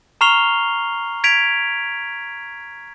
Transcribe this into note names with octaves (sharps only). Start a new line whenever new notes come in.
A#5 C#6 F6 C7 F7 G7
G#6 B6 D7 F7